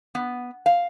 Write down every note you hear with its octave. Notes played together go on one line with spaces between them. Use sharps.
B3
F5